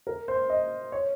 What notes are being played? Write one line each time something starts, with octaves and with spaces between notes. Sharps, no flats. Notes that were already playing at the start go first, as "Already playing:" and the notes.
A#4
C5
D#5
C#5